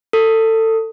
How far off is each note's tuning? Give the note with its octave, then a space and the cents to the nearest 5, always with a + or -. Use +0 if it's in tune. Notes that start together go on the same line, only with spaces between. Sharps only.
A4 +25